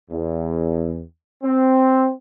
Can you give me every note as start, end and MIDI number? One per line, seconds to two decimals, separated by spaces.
0.10 1.00 40
1.42 2.09 60